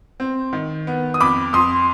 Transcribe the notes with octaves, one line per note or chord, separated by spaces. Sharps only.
C4
D#3
B3
D#6
F2 B5 D6
F2 C6 D#6